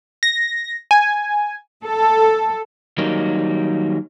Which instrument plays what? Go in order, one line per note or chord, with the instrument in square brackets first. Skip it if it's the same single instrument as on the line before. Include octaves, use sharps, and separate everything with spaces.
[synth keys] A#6
G#5
[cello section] A4
[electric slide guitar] D#3 F#3 G3 A#3 D#4